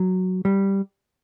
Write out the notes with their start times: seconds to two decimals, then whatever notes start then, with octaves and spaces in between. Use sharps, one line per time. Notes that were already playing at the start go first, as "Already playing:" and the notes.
Already playing: F#3
0.45 G3